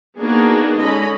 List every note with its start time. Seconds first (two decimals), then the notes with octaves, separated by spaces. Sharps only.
0.19 A#3 B3 D4 D#4 F#4 G#4
0.79 D3 G#3 C#4 D#5 B5